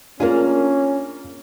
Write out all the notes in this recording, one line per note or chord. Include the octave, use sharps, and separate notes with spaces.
A#3 C#4 D4 F4 G#4 A#4